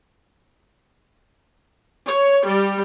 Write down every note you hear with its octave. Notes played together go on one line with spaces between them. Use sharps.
C#5
G3